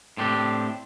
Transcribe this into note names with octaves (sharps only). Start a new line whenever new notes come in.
A2 C4 D4 G4